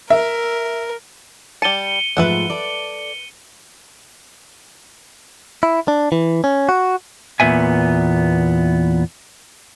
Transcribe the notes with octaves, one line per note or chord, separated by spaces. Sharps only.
A#4 E5
G3 A5 C#7 D#7 G7
G#2 F3 A3 B4 E5 F#5
A4 D5
E4
D4
E3
C#4
F#4
E2 A#2 B3 E5 G#5